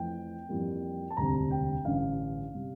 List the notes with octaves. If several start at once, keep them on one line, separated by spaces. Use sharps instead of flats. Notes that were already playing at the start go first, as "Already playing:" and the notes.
Already playing: F2 E3 A3 C4 G5
F2 E3 G3 A#3
A5
E1 D2 C3 G3 C4 A#5
G5
A1 G2 D3 F5
C3 G3